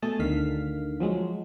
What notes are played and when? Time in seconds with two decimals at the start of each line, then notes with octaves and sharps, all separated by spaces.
0.02 B2 A3 G#4 A5 D#6
0.19 D2 D3 D#3 F5 B6
1.00 F3 F#3 G#3